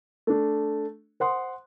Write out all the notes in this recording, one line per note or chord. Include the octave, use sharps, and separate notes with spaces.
A3 D4
C5 F#5 C6 D#6